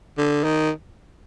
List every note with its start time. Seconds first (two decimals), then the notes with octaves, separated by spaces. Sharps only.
0.18 D3
0.44 D#3